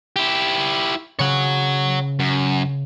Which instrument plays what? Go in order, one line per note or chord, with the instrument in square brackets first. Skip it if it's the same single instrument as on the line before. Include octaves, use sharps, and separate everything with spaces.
[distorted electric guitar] E4 G4
[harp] C#3 [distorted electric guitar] C#5 F#5
[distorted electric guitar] F#2